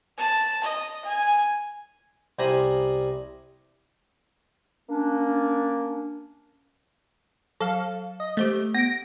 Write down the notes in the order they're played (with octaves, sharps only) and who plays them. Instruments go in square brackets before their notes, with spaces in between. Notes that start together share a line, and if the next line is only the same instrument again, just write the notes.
[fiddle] A5
D#5
G#5
[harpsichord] C2 G3 C5 G#5 A#5 B5
[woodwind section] A#3 C#4 D4
[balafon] F#3 [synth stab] A4 F5
[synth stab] D#5
[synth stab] A3 [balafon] G4 C5 D#5
[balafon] B3 [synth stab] A#6 D7